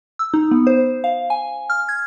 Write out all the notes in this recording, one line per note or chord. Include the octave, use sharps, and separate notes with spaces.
E6
D#4
B3
C5
F5
G#5
F6
G#6